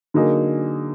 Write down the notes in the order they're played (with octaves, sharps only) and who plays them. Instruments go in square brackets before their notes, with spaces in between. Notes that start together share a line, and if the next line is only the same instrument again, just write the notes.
[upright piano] D3 F#3 A#3 D#4 G#4